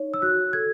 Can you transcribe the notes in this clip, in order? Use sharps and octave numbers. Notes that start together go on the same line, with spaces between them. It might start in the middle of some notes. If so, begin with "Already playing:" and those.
Already playing: D#4 C#5
E6
F#4 F#6
A4 G#6